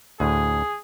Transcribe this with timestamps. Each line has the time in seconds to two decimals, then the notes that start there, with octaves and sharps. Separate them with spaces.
0.20 D2 A2 G#4